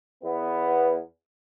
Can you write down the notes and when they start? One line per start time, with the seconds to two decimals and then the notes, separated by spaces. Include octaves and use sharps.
0.23 E2 B3